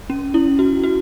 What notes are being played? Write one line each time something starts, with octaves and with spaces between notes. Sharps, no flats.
C#4
E4
F#4
F#4